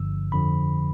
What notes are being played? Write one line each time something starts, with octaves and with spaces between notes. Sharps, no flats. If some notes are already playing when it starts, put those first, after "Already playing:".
Already playing: G1 G2 D3 F3 E6
F2 D3 F3 B5